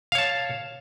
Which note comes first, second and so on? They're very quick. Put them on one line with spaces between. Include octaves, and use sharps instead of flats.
F5 C#5 A5